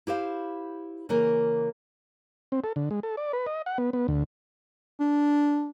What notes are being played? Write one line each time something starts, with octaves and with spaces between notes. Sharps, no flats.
E4 G4 C5 F5
C#3 E3 A#3 A#4
C4
A4
D3
G#3
A4
D5
B4
D#5
F#5
B3
B3
D2
D4